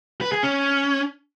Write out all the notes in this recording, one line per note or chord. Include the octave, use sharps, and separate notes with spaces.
B4
G#4
C#4